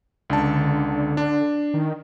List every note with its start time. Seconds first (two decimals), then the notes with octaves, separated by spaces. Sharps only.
0.30 C#2 D3 A5
1.17 D4
1.74 D#3